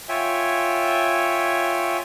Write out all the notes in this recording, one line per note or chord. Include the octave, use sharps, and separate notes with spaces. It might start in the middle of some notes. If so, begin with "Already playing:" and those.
F4 C#5 E5 G5 G#5